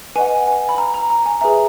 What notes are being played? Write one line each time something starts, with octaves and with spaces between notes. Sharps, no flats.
B4 D#5 F#5 G#5
G#5
B5
A#5
A#5
A#5
G#5
G#4 B4 E5 A#5